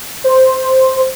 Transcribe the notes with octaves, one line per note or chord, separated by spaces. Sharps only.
C5